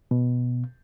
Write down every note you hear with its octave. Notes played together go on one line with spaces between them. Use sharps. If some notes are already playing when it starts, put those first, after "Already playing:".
B2